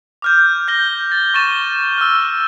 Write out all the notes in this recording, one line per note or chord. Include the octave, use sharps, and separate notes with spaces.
D6 F6 G6
G6 A#6 G7
A6
C#6 A6 D#7 E7 G7
E6 F6